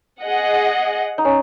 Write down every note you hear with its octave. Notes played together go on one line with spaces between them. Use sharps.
G#4 D#5 F#5
D#4
C#4